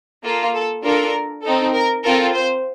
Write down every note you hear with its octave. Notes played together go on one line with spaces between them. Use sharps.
A#3 F4 A4
A4
D4 F4 A4 A#4
C4 D#4 A4
A#4
C4 F4 A4 A#4
C5